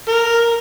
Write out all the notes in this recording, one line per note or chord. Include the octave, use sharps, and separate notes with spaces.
A#4